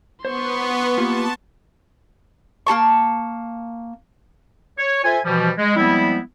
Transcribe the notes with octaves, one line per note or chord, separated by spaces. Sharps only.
B3 C5 C6 C#6
A#3 F4 G4 A5
A#3 F4 A5 C#6
C#5
F4 A4 C5 E5 G#5
B2 E3 F3 G3
G#3
F3 G3 G#3 B3 C4 E4